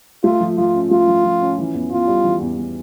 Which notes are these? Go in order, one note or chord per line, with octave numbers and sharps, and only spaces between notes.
A3 F4
F3
F3 F4
C#4
A3 F4
F3
F3
C#4
E3
E2
E2 F4
G3
E3
E2
E2